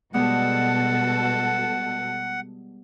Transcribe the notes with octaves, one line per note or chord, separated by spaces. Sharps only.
B2 G3 G#3 B3 F#4 A4 F#5